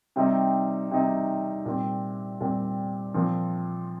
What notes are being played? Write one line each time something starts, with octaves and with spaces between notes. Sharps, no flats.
C3 G3 C4 D#4
C3 G3 C4 D#4
A#2 G3 C4
A#2 G3 C4
A#2 F3 C4